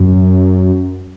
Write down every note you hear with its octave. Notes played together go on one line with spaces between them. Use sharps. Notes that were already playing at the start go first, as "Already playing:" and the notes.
Already playing: F#2